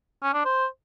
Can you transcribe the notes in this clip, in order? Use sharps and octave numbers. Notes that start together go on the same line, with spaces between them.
C#4
D4
C5